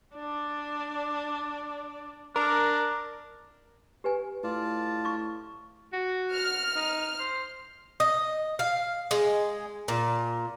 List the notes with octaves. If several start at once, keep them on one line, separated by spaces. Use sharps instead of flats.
D4 D5
D4 A#4
G4 B4 G#5
A2 F4 D5 A5
C#6 D6
F#4
F6
D#4
C5
D#5
F5
G#3
A#2